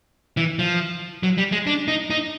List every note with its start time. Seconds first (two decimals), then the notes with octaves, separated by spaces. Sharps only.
0.37 E3
0.59 F3
1.23 F#3
1.38 G3
1.52 G#3
1.67 D4
1.88 D#4
2.10 D#4